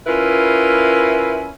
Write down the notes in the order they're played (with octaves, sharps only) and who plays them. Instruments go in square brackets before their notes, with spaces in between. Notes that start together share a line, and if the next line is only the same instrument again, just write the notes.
[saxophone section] C#4 E4 F4 A#4 B4